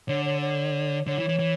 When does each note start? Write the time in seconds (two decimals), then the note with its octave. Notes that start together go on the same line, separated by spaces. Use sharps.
0.08 D3 C#5
0.25 C#5
0.41 C#5
1.07 D3 C#5
1.18 E3
1.29 E3
1.39 E3